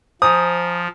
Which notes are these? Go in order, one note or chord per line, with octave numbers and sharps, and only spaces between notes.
F3 C5 G#5 A#5 D#6